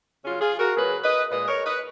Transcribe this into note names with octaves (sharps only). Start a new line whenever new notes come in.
C#3 F#3 C#4 F4
F4 G#4
F#4 A#4
C#3 F#3 G#4 B4
B4 D#5
A#2 G#3 B4 D#5
A#4 C#5
B4 D#5